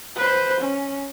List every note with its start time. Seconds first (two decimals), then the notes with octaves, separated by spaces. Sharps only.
0.17 B4 C5
0.61 C#4